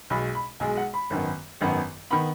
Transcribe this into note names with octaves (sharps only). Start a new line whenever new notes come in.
B1 B2 G#3 B5
B5
B1 B2 G#3 G#5
F#5
B5
G#1 F#2 D#3 B3
G#1 F#2 D#3 B3
D#3 B3 B5